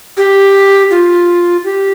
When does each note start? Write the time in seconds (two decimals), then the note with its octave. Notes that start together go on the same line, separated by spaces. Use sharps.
0.17 G4
0.91 F4
1.64 G4